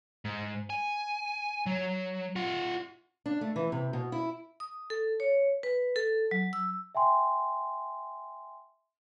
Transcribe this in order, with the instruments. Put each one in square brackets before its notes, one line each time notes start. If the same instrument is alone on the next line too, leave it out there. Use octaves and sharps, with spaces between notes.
[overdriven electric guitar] G#2
G#5
F#3
F4 F#5
[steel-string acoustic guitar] D4
A3
E3
C3
B2
E4
[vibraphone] D#6
A4
C#5
B4
A4
F#3
E6
[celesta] E5 G5 G#5 C6